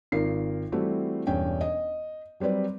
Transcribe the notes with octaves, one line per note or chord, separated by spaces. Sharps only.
G#1 F4 A#4 C7
E3 G3 A3 C4 E4 F#4
E1 G2 C#4 G5
D#5
F#3 G3 C4 B4 D5